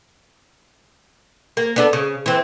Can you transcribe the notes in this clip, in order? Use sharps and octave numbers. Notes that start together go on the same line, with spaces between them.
A#3
B3 D4 A4
C#3
E3 C4